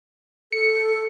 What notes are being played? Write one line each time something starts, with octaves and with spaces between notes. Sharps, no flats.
A4 C#7